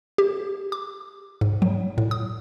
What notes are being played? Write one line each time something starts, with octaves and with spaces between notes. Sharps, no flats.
G4
D6
G#2
F#3
A2
D#6